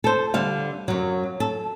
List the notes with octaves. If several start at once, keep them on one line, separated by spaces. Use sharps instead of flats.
A4 C5
D3 G3 F5
F#2 F#3
A4